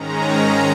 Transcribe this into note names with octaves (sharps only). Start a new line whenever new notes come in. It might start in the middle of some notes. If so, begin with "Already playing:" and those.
Already playing: G#2 D#3 G#3 C#4 A#5